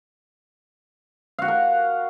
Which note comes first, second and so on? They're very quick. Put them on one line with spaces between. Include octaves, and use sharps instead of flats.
F5 F#4 F#5 A#4